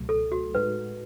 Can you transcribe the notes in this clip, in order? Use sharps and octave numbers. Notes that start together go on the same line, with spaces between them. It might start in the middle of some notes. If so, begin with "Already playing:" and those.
Already playing: C#2 B2 F#3 A3
A4
F#4
A2 G#3 D#4 F#4 B4